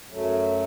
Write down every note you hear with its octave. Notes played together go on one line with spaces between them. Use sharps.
F#2 F#3 A3